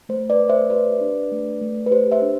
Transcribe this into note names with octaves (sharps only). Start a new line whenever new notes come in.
A3 C5
B4 D5
A3
C5 E5
G4 B4 D5
D4
A3
A3
B4
G4 C5
C5 E5
D4